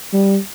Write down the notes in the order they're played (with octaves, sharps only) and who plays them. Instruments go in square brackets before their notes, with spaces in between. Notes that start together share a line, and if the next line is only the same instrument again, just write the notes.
[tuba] G3